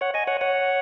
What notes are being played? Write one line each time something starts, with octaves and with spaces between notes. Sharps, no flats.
C#5 F#5
D#5 G#5
C#5 F#5
C#5 F#5